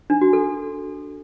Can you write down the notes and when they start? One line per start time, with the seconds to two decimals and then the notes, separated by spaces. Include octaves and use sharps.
0.10 D4
0.21 F#4
0.33 A4